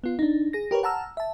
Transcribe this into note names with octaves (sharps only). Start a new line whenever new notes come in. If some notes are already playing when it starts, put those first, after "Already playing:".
B3 F4
D4 D#4
G#4 A#6
G4 A#4 B4 C#5
F#5 A5 A#5 E6 F6
E5 A5